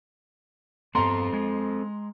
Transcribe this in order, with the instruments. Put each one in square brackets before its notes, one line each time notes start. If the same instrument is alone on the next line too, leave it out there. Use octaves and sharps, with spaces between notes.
[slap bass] G2 B3 [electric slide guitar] C4 A4 [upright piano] A#5 C6
[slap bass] G#3